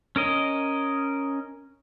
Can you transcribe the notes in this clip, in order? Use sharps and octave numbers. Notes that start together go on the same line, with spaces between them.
C#4 A#4 D#5